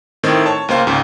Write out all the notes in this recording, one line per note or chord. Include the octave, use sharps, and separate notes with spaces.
A2 D#3 C4
C#5 A5
C#2 A#3 C5 F5
C#2 G#2 C#3